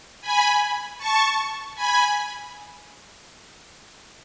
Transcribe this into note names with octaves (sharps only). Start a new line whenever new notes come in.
G#5 B5
A5 C#6
G#5 B5